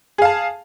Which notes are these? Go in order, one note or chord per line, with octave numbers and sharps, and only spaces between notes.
G#4 F5 A5